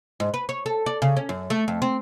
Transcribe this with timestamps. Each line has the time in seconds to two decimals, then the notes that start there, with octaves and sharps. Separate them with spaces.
0.20 G#2
0.34 B4
0.49 C#5
0.66 A4
0.86 D5
1.02 C#3
1.17 C#4
1.29 F#2
1.50 A3
1.68 F2
1.82 C4